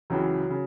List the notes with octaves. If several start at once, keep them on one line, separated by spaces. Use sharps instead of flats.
C#2 C#3 E3 F#3
C#3